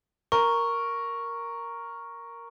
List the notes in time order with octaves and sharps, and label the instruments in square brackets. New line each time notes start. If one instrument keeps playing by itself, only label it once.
[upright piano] A#4 [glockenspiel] C#6